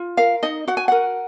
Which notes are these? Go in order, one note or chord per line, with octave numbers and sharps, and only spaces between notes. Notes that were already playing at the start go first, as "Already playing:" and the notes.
Already playing: F4
A#4 F5
D#4 D#5
F#4 F#5
G#5
A#4 F#5